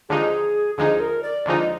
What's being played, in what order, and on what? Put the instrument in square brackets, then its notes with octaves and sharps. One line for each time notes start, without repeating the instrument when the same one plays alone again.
[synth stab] D#2 D3 F3 G#3 D#4 [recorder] G#4
[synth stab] D#2 D3 F3 G#3 D#4 [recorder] G#4
[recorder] A#4
D5
[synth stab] D#2 D3 F3 G#3 D#4